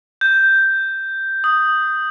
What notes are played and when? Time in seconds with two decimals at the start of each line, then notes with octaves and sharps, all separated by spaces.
0.21 G6
1.44 D#6